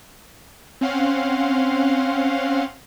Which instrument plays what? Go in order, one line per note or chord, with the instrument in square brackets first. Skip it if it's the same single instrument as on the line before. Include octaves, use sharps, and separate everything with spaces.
[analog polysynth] C4 C#4 F5 F#5 C6